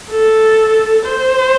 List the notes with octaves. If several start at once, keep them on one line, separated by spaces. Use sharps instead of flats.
A4
C5